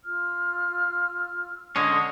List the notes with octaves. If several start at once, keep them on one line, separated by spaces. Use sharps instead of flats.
F4 E6 F6
D3 G#3 C#4